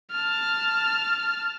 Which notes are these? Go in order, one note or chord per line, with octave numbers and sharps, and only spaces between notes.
A5 F6